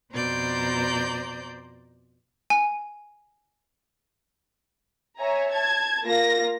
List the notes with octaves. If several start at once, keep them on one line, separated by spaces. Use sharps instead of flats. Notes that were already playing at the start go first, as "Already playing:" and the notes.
F2 B2 C5 D5 A#5 G6
G#5
C#5 E5 G#5 A#5
A5 G#6
A#3 F4 A#6